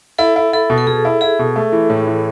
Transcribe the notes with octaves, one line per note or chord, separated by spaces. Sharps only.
E4 A4
E4
E4 A4
B2
A4
B2 G#4
E4
E4 G#4
B2
A3
E3
A2
E3